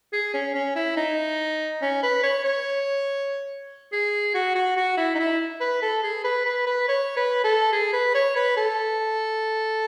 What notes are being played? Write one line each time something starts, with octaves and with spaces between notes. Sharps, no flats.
G#4
C#4
C#4
E4
D#4
C#4
B4
C#5
C#5
G#4
F#4
F#4
F#4
E4
D#4
E4
B4
A4
G#4
B4
B4
B4
C#5
B4
A4
G#4
B4
C#5
B4
A4